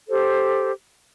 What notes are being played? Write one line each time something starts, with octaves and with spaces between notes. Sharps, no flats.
G4 A4 C5